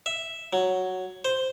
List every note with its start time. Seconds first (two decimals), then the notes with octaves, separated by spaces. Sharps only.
0.06 E5
0.53 F#3
1.25 C5